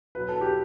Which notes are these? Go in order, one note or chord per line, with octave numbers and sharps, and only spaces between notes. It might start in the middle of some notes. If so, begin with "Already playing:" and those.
B2 F#3 B4
A4
G4